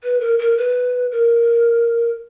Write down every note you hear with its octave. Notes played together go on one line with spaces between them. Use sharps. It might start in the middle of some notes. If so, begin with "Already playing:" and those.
B4
A#4
A#4
B4
A#4